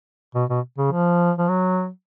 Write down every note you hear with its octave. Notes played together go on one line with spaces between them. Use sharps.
B2
B2
C#3
F3
F3
F#3